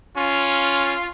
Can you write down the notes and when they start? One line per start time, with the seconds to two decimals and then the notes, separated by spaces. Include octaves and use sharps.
0.17 C#4 F4